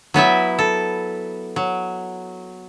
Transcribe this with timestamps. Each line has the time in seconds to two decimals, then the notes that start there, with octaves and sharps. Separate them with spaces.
0.14 F#3 B3 E4 E5
0.59 A4
1.56 F#3